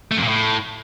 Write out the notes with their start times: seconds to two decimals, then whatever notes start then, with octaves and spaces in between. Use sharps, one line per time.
0.12 A3
0.17 F2
0.23 A#2
0.28 A2